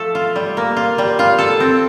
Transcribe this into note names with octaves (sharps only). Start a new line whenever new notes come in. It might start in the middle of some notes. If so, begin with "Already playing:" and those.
Already playing: F3 A3 A4
F4
G3
A#3
F4
G3
F4
A4
C4